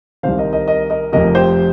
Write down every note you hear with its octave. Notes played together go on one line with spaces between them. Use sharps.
C2 C3 D#3 C5 F5
A#4 D#5
A#4 D#5
A#4 D#5
A#4 D#5
F1 F2 C3 A#4 D#5
G4 C5